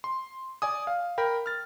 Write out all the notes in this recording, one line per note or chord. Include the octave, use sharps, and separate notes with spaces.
C6
D5 G#5 D#6
F5
A#4 G5 B5
F6 A6